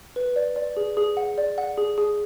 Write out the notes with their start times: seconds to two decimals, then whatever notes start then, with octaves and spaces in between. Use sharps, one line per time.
0.16 B4
0.36 D5
0.56 D5
0.77 G#4
0.97 G#4
1.17 F#5
1.38 D5
1.58 F#5
1.78 G#4
1.98 G#4